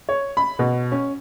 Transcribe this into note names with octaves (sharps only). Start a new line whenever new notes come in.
C#5
B5
B2
C#4